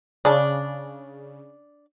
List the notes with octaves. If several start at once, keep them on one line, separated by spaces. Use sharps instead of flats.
C#3 D4 D5